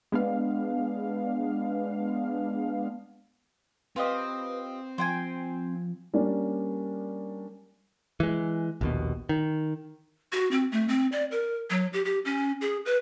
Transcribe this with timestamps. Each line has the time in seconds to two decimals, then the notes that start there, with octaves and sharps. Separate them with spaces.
0.12 G#3 B3 D4 F5
3.96 C4 F4 G4 B4 D#5
4.98 F3 C5 G5 G#5
6.14 G3 A#3 C#4 D4
8.20 E3 G#3
8.81 A#1 D#2 B2
9.29 D#3
10.32 F#4
10.51 C4
10.72 A3
10.89 C4
11.12 D5
11.31 A#4
11.70 F#3
11.93 G4
12.05 G4
12.25 C#4
12.61 G#4
12.86 B4